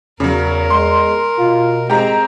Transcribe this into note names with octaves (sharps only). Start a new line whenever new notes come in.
E2 C#3 F#3 A#4
G#3 C6
B2 F4
G#3 C4 G4 A#5